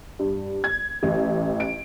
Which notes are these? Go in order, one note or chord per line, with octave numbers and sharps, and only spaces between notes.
G2
G#6
A1
D7